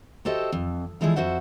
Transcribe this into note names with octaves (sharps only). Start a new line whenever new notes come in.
F#4 G4 A4 C5 D#5 E5
F2
D3 E3 F3 G#3 E4 G#4
F2 F#4 C5 E5 F#5